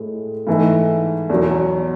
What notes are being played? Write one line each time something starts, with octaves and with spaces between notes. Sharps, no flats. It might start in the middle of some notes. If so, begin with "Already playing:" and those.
Already playing: A2 G#3
G#2 E3 A3
E2 B2 F#3